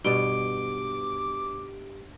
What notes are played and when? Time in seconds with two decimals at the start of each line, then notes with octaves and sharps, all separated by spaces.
0.04 G2 B2 G4 C#5 D6 D7 G7